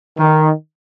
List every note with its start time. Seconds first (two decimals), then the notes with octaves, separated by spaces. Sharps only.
0.18 D#3